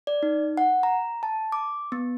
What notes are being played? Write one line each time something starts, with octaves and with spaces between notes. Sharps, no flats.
D5
D#4
F#5
A#5
A5
D6
B3